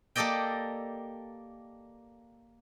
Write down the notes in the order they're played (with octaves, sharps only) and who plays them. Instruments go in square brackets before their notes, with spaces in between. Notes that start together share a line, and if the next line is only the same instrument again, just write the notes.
[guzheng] A#3 G4 A4 D5 D#5 G5